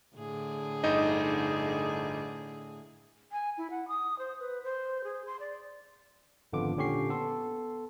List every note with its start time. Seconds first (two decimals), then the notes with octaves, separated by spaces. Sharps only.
0.16 A2 D3 G#4
0.83 G1 D#4 D#5
3.32 G#5
3.58 E4
3.71 F#5
3.88 D#6
4.19 C5
4.40 B4
4.64 C5
5.04 G#4
5.26 C6
5.40 D5
6.53 G#1 F2 D3 B3 F4 D6
6.77 A#2 D3 C#4 G4 C#6 C7
7.09 B3 A4 C6